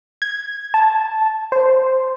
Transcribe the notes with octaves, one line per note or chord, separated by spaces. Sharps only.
G#6
A5
C5